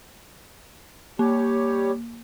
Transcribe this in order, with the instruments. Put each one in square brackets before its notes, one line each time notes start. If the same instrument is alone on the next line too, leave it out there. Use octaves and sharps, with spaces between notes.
[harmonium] G3 G4 C#5 [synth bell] A#3